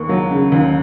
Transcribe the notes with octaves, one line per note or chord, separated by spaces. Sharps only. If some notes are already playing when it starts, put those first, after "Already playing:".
Already playing: D#2 A#3 C#6
F#3
C#3
D#2